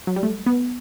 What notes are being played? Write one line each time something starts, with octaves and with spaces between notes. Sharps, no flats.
F#3
G3
A3
B3